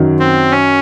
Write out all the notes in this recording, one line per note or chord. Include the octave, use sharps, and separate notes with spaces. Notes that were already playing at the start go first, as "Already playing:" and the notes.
Already playing: F#2 D#3 F#3
C4
C#4